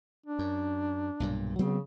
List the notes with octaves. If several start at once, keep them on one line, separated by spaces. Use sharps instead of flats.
D4
F#2
B1 G2 A#2
C#3 F#3 B3 C4